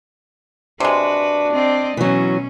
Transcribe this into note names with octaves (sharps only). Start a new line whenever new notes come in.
C3 G#3 D4 F#4 B4
C4 D5 D#5
B2 E3 F#3 C#4